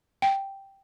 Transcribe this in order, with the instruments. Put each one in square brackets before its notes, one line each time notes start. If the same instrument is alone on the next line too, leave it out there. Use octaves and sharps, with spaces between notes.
[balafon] G5